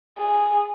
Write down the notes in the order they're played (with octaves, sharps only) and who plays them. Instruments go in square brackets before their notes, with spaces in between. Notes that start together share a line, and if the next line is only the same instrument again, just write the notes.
[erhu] G#4